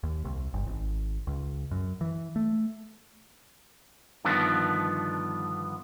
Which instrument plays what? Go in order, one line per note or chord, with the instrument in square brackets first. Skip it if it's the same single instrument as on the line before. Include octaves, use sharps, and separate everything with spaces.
[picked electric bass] D#2
C2
G1
G#1
C#2
F#2
E3
A3
[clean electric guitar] G2 D3 D#3 F3 B3 D4